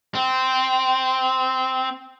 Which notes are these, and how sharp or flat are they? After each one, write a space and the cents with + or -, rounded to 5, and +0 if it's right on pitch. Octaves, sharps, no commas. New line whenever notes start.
C4 -10